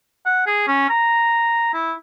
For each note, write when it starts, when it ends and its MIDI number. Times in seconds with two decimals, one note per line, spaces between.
0.26 0.42 78
0.47 0.65 68
0.68 0.89 61
0.90 1.71 82
1.74 1.93 64